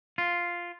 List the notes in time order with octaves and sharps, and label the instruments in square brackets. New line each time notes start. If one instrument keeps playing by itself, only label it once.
[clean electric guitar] F4